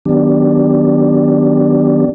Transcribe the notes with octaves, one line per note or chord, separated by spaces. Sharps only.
D#3 F#3 B3 D4 G4 D5